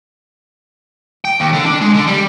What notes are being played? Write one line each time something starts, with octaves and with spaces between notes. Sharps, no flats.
G5
D#2
D3
D4
G#3
D3
G3